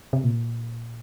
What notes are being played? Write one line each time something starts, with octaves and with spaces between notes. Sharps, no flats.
C3
A#2